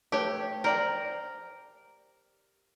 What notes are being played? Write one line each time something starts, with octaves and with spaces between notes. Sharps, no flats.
A3 G4 B4 C#5
A#4 C5 D5 G5